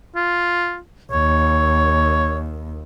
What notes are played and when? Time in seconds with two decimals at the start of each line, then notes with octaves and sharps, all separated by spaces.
0.16 F4
1.12 D#2 C#5